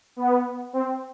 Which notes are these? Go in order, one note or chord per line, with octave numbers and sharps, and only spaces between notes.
B3
C4